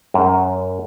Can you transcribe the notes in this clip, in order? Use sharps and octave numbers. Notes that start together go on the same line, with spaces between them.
F#2